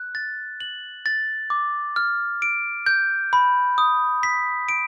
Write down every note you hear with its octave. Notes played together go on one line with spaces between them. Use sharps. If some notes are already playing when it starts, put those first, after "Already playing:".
Already playing: F#6
A6
F#7
A6
D6
F6
D7
G6
B5
D#6
B6
D7